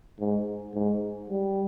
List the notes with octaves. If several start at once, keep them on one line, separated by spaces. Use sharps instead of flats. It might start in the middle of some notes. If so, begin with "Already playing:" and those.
G#2
G#2
G3